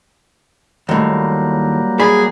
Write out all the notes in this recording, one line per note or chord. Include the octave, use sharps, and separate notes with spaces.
D#2 A2 F#3 G3 A#3
G#4 D5 B5